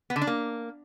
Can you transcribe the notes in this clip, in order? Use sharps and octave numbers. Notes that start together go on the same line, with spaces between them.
B3
D3
D4
A#3